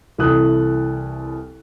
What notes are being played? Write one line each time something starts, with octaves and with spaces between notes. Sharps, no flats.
C2 E3 E4 A4 D#6 F#6